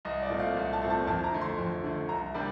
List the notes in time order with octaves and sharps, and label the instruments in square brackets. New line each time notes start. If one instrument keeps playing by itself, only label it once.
[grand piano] C2 D#5
D5
A#2 A3 C4
F5
C2
A5
A#2 A3 C4
A5
F2 A5
A#5
D3 A3
C6
F2
D3 A3
C2 A#5
C3 G3 A#3 D4